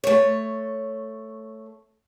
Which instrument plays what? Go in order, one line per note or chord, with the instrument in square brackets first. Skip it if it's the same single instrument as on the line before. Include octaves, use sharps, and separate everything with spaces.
[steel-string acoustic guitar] A3 C#5